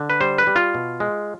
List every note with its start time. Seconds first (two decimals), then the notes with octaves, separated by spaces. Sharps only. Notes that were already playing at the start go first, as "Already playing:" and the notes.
Already playing: D3
0.10 B4
0.21 G3 C5
0.38 B4
0.47 G3
0.56 F4
0.74 B2
1.00 G#3